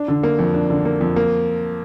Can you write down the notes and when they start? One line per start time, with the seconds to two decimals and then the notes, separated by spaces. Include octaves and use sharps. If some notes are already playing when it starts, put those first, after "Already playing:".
Already playing: D4
0.08 D3
0.23 A#3
0.39 F2
0.54 D4
0.70 D3
0.85 A#3
1.01 F2
1.16 A#3